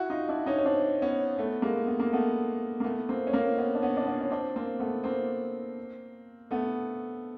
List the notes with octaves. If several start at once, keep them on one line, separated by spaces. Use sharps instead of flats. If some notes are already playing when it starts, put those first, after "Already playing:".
Already playing: E4 F#4
D#4 F4
D4 E4
C#4 D#4
C#4
C4 D4
B3 C#4
A3 B3
G#3 A#3
B3
A#3
A3 B3
A#3
A3 B3
A#3 C4
C#4
A#3 C4
B3 C#4
D4
B3 C#4
D4
B3 C#4
C#4
C4 D4
A#3 C4
A3 B3
A#3 C4
A3 B3